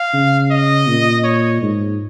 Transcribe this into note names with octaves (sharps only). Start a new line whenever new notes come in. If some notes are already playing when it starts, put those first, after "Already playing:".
Already playing: F5
C#3
D#5
A#2
C#5
G#2